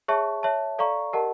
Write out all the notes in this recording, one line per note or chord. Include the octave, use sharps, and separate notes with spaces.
G#4 C#5 E5 A5 C#6
C#5 E5 A5
A4 D5 F5 A#5 C#6
G4 A#4 D#5 F#5 A5